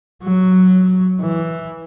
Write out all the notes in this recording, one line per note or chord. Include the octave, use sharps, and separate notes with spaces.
F#3
E3